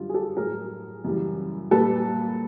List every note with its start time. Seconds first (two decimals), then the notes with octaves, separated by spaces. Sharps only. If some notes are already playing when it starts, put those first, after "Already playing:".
Already playing: F#2 D3 G3 F4
0.09 G#4
0.14 G4 A4
0.37 A2 F#3 G#4 A#4
1.04 F#2 C#3 E3 G3
1.71 A#2 G3 A4 B4